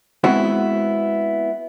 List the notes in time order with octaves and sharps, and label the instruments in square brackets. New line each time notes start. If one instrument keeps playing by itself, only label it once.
[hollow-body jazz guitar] G#3 B3 C4 E4 F#4 G#4